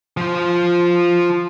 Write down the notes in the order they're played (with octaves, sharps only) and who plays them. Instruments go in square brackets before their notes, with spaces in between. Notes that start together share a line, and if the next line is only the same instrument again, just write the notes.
[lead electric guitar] F3 C5